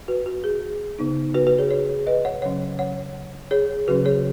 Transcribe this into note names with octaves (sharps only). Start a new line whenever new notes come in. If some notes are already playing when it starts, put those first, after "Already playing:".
F#4 B4
F#4
G#4
C#3 B3 D#4
F#4 B4
F#4 B4
G#4 C#5
G#4 C#5
B4 D#5
C#5 F#5
C#3 F#3 C#4 C#5 F#5
C#5 F#5
G#4 C#5
C#3 F#3 C#4 F#4 B4
G#4 C#5